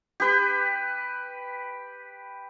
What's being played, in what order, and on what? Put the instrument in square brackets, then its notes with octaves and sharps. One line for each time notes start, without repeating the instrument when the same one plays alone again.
[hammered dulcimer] G4 B4